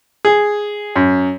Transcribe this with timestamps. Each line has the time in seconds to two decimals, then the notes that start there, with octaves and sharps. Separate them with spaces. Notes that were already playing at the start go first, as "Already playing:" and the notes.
0.25 G#4
0.96 F#2